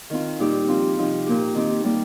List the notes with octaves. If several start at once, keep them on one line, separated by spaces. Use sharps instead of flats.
D#3 C4 F4
A#2 G3 D#4 G4
F3 C4 F4
C3 F3 D#4 G4
A#2 A#3 G4
D#3 C4 D#4 G4
G3 A#3 G4